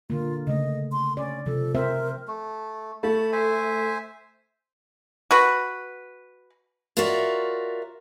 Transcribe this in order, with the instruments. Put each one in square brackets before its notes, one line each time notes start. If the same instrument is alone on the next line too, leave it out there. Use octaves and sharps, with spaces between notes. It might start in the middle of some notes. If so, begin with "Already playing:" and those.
[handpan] D3 A#3 [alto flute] F4
[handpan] C#3 A3 [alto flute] D#5
[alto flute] C6
[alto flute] C#4 [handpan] D5
[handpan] C3 F3 [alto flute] A4
[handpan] C4 C5 E5 [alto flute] A#4
[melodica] A3
[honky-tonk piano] A3 [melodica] A5 B5
[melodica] C5 E5 G#5
[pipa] F#4 B4
[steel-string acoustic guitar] F4 F#4 A#4 C#5 D5 E5